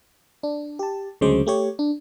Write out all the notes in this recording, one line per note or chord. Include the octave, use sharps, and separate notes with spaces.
D4
G4 A5
D2 C#3 F#3 G#3 C5 D6
A3 G4 C#5
D4